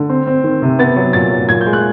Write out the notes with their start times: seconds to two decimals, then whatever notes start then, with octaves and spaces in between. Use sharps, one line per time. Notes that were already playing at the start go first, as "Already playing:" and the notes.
Already playing: D3
0.09 C4
0.27 C4
0.44 D#3
0.62 C3
0.79 B3 A6
0.96 F#3
1.13 A#2 A6
1.31 F#3
1.49 A#2 G#6
1.61 G6
1.66 G#3
1.73 F#6